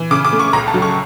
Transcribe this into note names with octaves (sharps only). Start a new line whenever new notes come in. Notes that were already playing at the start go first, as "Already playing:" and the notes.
Already playing: E3
C#3 D6
D6
A3
C#6
C#2 A#5
A5
F#3
C#6